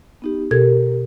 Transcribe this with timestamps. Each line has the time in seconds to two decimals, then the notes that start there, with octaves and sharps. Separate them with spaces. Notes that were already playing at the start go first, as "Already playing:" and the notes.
0.22 B3 D#4 G4
0.51 B2 G4 A4 A#4 G#6